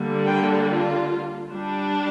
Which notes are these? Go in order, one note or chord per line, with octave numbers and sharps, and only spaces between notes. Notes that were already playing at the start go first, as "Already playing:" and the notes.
Already playing: D3 G3 A#3 D4
G5
F4
G3 D4